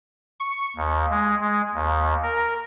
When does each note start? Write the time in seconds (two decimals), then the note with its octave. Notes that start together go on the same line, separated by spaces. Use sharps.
0.40 C#6
0.76 D#2
1.11 G#3
1.41 G#3
1.74 D#2
2.23 A#4